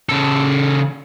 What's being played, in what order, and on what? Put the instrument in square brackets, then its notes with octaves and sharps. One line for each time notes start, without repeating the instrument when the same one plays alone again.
[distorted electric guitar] C#3 A4